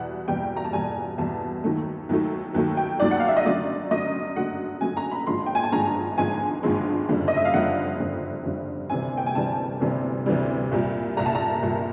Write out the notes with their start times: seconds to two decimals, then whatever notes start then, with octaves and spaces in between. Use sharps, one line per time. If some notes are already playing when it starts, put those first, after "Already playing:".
Already playing: E2 B2 G3 F#5
0.28 E2 B2 G3 G5
0.57 A#5
0.65 A5
0.73 E2 B2 G3 G#5
1.18 E2 B2 G3 A5
1.64 D#2 D#3 F#3 A3
2.09 D#2 D#3 F#3 A3
2.54 D#2 D#3 F#3 A3
2.77 G5
3.00 D#2 D#3 F#3 A3 D5
3.11 F#5
3.20 F5
3.28 E5
3.37 D#5
3.45 F#2 D3 F#3 A3 D5
3.91 F#2 D3 F#3 A3 D#5
4.36 F#2 D3 F#3 A3 F#5
4.81 F#2 D3 F#3 A3 G#5
4.97 A#5
5.11 B5
5.27 G#1 G2 D3 F3 G#3 C6
5.46 G5
5.55 G#5
5.64 A5
5.72 G#1 G2 D3 F3 G#3 A#5
6.18 G#1 G2 D3 F3 G#3 G#5
6.63 G#1 G2 D3 F3 G#3
7.08 F#1 F2 D3 G3
7.28 D#5
7.36 E5
7.45 F5
7.53 F#1 F2 D3 G3 F#5
7.99 F#1 F2 D3 G3
8.44 F#1 F2 D3 G3
8.90 D2 C3 E3 G3 G#5
9.17 G5
9.26 G#5
9.35 D2 C3 E3 G3 A5
9.80 D2 C3 E3 G3
10.26 D2 C3 E3 G3
10.71 C2 A#2 G3
11.17 C2 A#2 G3 A#5
11.26 A5
11.35 A#5
11.62 C2 A#2 G3